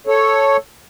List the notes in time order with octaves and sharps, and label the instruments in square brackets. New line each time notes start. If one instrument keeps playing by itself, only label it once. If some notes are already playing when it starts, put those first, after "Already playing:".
[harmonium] A4 C#5